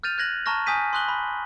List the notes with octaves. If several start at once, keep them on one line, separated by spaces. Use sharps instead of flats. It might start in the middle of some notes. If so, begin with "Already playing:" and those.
F6 G6 A6 D#7 F7
F#6 G#6 A#6 F#7
A5 A#5 C#6 F6 A#6
G#5 D#6 G6 B6 D#7
C6 D#6 F#6 F#7 G7
B5